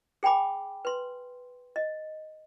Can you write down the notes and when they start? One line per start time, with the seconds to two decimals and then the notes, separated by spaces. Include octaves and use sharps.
0.23 G#4 G5 G#5 B5 D6
0.85 B4 C6
1.76 D#5